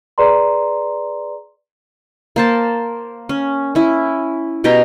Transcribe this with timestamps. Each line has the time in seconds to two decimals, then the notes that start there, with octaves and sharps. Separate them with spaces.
0.18 G#4 B4 D5 A#5 C6
2.36 A#3 C5 A5
3.29 C#4
3.75 C#4 E4
4.64 B2 G4 G5 A#5